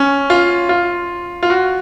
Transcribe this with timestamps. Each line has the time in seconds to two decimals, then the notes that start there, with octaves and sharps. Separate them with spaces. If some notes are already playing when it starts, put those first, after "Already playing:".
Already playing: C#4
0.30 F4
0.69 F4
1.43 F4
1.50 F#4